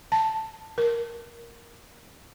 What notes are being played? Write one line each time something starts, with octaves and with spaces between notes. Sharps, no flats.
A5
A#4